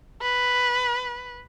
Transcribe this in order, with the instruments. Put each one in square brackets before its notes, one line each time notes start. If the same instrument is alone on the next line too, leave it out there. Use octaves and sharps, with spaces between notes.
[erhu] B4